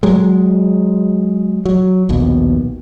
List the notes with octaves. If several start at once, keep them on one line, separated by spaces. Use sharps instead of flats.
F#3 G#3
F#3
A#1 D#2 B2